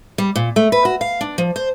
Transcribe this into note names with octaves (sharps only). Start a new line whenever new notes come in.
G3
A#2
A3
B4
F#4
F5
D4
F3
C5